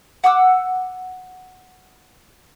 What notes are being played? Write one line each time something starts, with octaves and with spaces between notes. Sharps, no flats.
F#5 D6 E6